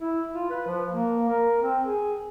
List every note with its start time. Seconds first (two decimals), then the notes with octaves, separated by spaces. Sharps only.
0.01 E4
0.35 F4
0.50 B4
0.67 F3
0.91 A#3
1.29 A#4
1.62 C4
1.84 G#4